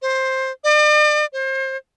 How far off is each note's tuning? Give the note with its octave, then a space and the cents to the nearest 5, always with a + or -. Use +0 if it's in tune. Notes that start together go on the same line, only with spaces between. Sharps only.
C5 +15
D5 +40
C5 +30